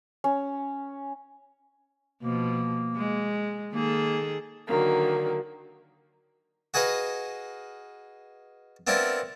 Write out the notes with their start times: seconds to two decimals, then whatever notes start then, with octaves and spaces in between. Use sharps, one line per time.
0.24 C#4
2.23 B2 F3 A#3
2.96 G#3
3.73 D#3 A#3 G#4 A4
4.66 D3 D#3 F#3 A#3
6.74 F#4 G#4 B4 D#5 F5
8.87 B3 C4 D4 E4 F4 A#4